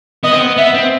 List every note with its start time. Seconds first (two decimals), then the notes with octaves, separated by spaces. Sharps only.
0.23 B3 D#5
0.33 C4
0.40 B3
0.57 B3 E5
0.74 C4